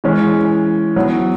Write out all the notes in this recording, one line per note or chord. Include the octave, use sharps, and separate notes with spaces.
E3 G#3 C#4
F#3 B3 E4